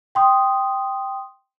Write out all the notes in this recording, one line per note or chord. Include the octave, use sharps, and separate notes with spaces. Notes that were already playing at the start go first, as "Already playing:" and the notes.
G5 C6 D#6